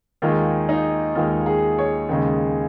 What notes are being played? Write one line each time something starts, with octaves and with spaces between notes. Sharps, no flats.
D#2 D#3 G#3 F4
D#4
D#2 D#3 G#3 F4
G#4
C#5
D#2 C#3 G#3